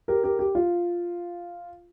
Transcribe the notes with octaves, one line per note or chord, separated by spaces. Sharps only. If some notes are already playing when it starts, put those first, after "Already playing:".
G4 A#4
G4 A#4
G4
F4